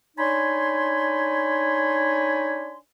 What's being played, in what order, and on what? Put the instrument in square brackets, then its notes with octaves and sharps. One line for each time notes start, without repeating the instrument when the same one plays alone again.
[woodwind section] D4 D#4 C#5 G#5 B5 C6